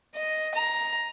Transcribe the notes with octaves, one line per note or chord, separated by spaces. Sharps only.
D#5
A#5